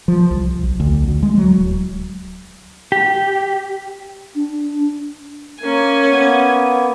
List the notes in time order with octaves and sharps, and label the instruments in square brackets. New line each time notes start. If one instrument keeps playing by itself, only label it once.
[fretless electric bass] F3
C2
B1
D2
D2
G#3
F#3
D1
[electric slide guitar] G4
[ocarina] D4
[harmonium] A#3 A#4 [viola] C#4 G#5
[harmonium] A#3 B3